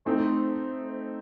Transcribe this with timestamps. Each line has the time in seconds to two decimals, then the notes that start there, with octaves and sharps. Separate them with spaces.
0.05 A3 C4 D#4 C5